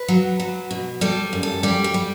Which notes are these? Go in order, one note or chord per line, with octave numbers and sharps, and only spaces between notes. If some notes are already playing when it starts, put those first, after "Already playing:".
Already playing: B4
F#3
F#3
B2
G3 A4
F#2
A4
G3 G4
G4
G3